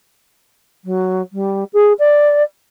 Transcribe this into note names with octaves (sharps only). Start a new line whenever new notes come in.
F#3
G3
G#4
D5